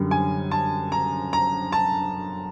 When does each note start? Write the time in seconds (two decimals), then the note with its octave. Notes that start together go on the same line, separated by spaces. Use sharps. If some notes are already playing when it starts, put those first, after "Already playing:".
Already playing: F#2 D3 G3
0.11 G#5
0.51 A5
0.92 A#5
1.33 A#5
1.72 A5